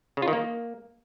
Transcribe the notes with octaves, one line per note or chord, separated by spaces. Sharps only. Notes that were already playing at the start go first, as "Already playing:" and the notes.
C#3
F4
D#3
A#3